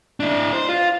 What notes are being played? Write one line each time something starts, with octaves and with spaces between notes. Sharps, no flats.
D4 E4
C5
F4